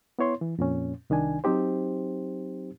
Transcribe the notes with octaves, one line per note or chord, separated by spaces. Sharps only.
B3 E4 C#5 C6
E3
F2 A#2 C#4
C2 D#3 D4 G#5
F#3 C4 D#4 G4 C5